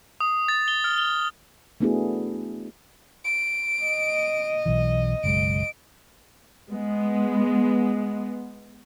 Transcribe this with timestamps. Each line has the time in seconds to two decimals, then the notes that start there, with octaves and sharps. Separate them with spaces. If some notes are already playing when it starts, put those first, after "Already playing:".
0.20 D#6
0.48 A6
0.68 G7
0.84 F6
0.98 G7
1.80 A3 B3 D4 E4 F#4 G#4
3.25 D7
3.84 D#5
4.66 B1 E3
5.24 F#1 B1 G#3 D7
6.70 G#3 B3